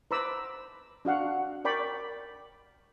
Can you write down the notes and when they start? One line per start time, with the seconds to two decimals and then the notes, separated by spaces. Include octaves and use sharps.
0.11 B4 C5 A#5 B5 D6 E6
1.05 D4 F#4 F5 F#5
1.65 A#4 D5 G5 B5 C#6